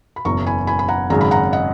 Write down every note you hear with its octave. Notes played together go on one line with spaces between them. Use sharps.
B5
F#1 E2 B2 A#5 C#6
G#5 B5
G#5 B5
B5
F#5 A#5
G#1 F#2 C#3 G#3 A#5
B5
F#5 A#5
D#5 F#5